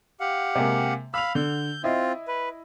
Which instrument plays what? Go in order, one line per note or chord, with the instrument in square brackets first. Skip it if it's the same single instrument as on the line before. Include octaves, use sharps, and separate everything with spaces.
[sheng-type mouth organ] G4 F5 F#5
[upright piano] C3 G#3 A#3
[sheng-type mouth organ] F5 B5 [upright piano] E6 F7
[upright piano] D3 [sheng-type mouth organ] G6
[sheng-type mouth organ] C4 F4 [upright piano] E4 D#5
[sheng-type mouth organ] B4